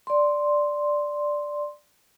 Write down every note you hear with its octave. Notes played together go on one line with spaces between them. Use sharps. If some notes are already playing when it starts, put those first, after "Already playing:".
D5 C6